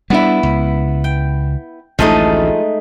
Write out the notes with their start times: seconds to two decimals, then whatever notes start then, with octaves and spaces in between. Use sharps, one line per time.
0.10 G3 B3 D4 E4
0.43 C#2
1.04 G5
1.99 A1 D2 F3 G#3 A3 D#4 G#4